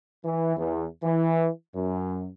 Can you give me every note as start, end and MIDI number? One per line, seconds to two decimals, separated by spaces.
0.25 0.54 52
0.57 0.85 40
1.04 1.48 52
1.75 2.29 42